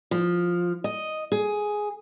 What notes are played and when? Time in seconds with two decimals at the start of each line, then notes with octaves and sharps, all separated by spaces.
0.11 F3
0.84 D#5
1.32 G#4